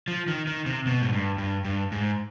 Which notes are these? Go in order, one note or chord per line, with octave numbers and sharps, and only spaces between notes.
F3
D#3
D#3
C3
B2
G#2
G2
G2
G2
G#2